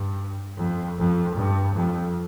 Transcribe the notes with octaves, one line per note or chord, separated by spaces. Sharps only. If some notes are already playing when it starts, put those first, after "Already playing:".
Already playing: G2
F2
F2
G2
F2